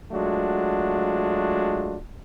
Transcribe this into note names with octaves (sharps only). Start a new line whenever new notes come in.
F#3 G#3 A3 D4 F4 F#4